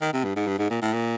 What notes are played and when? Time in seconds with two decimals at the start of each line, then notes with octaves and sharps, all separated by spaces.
0.01 D#3
0.13 C3
0.24 G2
0.36 G#2
0.47 G2
0.58 G#2
0.70 A#2
0.82 A2
0.93 A#2